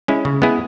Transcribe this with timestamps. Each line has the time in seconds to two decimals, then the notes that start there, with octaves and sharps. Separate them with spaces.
0.08 G#3 C#4 E4
0.25 C#3
0.42 G#3 B3 E4 G#4